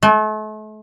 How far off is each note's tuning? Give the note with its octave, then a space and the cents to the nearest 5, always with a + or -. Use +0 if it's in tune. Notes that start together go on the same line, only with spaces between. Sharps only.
A3 -40